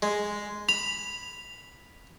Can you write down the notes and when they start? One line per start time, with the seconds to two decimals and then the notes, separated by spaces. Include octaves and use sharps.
0.02 G#3
0.69 B5 F7